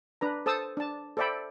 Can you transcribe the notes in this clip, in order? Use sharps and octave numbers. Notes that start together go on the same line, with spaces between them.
D4 B4 A#5
A4 C5 A5 D#6 E6
D4 A5
A4 C5 D5 E5 G5 B5